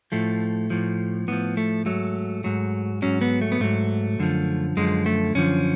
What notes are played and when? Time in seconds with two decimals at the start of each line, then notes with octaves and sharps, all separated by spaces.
0.12 A2 F3 A3
0.70 A2 F3
1.28 A2 F3 B3
1.57 A3
1.86 G#2 F#3 A3
2.44 G#2 F#3
3.02 G#2 F#3 C#4
3.21 B3
3.41 A3
3.52 B3
3.60 G#2 F#3 A3
4.19 F#2 D3 F3
4.77 F#2 D3 F3 G#3
5.06 A3
5.35 F#2 D3 F3 C#4